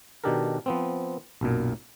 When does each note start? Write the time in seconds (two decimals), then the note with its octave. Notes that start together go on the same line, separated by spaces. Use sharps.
0.24 B2 D#3 D4 G4 A4 A#4
0.66 F3 B3 C4
1.41 B1 F#2 A#2